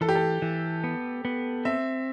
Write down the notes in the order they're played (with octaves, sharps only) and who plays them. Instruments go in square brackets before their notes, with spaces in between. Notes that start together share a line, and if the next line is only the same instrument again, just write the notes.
[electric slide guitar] E3 [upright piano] A4
[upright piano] G4
A4
[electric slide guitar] E3
B3
B3
[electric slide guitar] C4 [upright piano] E5